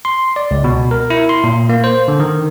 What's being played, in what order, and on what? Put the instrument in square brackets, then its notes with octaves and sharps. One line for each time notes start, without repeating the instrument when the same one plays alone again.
[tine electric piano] C6
D5
C#2
B2
A#4
E4
C6
A#2
A#3
C5
D3
D#3